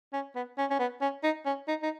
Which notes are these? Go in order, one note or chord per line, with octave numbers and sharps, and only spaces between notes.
C#4
B3
C#4
C#4
B3
C#4
D#4
C#4
D#4
D#4